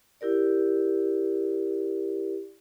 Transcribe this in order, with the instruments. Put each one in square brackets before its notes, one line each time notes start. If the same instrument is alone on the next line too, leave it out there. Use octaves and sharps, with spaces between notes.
[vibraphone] E4 G4 A#4 D5